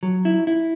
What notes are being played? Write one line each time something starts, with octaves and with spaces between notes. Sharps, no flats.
F#3
E4
E4